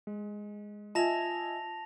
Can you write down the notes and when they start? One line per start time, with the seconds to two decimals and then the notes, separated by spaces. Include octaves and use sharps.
0.07 G#3
0.95 F4 D#5 E5 G#5 A5 A#6 F7